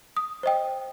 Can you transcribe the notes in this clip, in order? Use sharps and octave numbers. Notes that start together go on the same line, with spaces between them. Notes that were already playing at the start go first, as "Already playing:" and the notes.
D#6
C5 D#5 G5